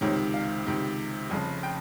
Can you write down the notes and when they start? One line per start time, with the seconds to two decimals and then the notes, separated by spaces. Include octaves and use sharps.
0.01 C#2 C3 D#3 C#5
0.34 F5
0.65 C#2 C3 D#3
1.30 F1 F2 C#3
1.63 G5